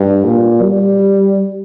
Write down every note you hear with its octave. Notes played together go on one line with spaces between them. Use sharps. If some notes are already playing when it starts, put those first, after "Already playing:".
Already playing: G2
A#2
G3